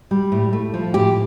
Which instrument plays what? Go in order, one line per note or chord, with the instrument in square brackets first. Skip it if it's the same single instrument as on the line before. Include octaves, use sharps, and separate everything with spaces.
[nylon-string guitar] G3
A2
A3
F3
A2 G4